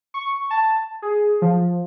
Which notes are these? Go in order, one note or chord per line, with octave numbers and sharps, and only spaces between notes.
C#6
A5
G#4
F3